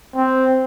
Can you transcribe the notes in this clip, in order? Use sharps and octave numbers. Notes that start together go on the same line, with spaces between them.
C4